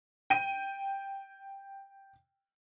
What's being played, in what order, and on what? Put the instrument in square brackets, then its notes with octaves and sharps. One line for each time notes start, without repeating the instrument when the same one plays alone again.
[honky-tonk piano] G5 D#7